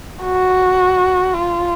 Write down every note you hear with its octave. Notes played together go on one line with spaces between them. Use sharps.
F#4
F4